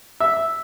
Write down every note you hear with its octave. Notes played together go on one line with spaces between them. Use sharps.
E5